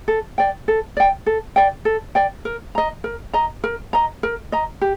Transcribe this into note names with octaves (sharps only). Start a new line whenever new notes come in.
A4
D5 G5
A4
D5 G5
A4
D5 G5
A4
D5 G5
A#4
D#5 A#5
A#4
D#5 A#5
A#4
D#5 A#5
A#4
D#5 A#5
G4